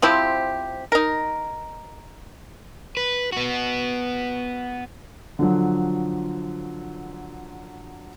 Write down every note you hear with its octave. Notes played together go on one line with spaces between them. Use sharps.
F3 C4 E4 G4
D#4 A#4
B4
B3 F#4
D3 F3 F#3